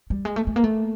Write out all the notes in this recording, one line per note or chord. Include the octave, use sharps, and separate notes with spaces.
G3
G#3
A3
A3
A#3
A3